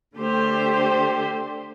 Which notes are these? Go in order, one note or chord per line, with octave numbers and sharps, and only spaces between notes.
D3 A3 G4 C5